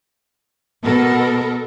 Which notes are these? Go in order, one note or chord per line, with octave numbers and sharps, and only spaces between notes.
B2 B3 A4 A#4